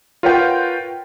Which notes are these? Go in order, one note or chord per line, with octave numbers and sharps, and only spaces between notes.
F4 A#4 B4 C#5 F#5 G5